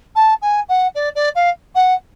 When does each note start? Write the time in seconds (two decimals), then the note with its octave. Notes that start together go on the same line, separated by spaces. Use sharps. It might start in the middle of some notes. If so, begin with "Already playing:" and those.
0.15 A5
0.42 G#5
0.69 F#5
0.95 D5
1.15 D5
1.35 F5
1.75 F#5